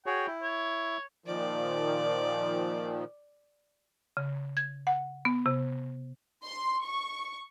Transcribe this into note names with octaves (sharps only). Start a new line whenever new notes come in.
F#4 G#4 C#5 G5
E4
C#5
A#2 D#3 F3 D5
C#3
G#6
F#5
B3
C3
C6
C#6